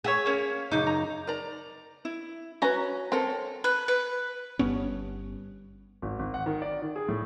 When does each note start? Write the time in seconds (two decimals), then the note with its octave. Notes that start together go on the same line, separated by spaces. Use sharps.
0.04 G#4 C#5 E5 F#5
0.26 A#3 C#4
0.71 F#2 C#3 D#4 D6 G6
0.87 A#5
1.27 A#4 D5 A#5
2.05 E4
2.62 C#4 F#4 B4 A#5
3.12 C4 A4 A#4 C#5
3.64 B4
3.88 B4
4.59 G1 G2 B3 C#4
6.02 G#1
6.19 G#1
6.34 F#5
6.46 D#3
6.62 D5
6.82 D#3
6.96 G#4
7.09 A2